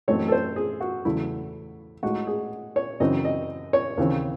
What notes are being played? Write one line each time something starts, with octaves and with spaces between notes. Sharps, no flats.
F#2 E3 A3 C4 D#4 C#5
A4
C5
G#4
F#4
E2 C#3 F#3 A3 E4
A2 G#3 D#4 F#4
G#4
C#5
F#2 C#3 E3 C4 D#4 D#5
D#5
C#5
D#2 C#3 E3 C4